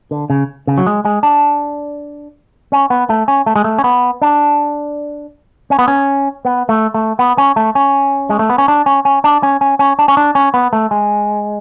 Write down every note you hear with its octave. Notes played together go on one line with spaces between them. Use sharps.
D3
C#3
C#3
F#3
G#3
G#3
D4
C#4
B3
A3
C#4
A3
G#3
A3
C#4
B3
D4
C#4
B3
C#4
B3
A3
A3
B3
C#4
A3
C#4
G#3
A3
B3
C#4
D4
C#4
C#4
D4
C#4
C#4
C#4
D4
C#4
D4
C#4
B3
A3
G#3